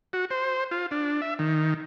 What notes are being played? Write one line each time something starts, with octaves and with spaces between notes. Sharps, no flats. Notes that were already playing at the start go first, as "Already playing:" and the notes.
F#4
C5
F4
D4
E5
D#3